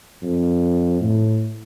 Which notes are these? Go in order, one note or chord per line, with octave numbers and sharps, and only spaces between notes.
F2
A2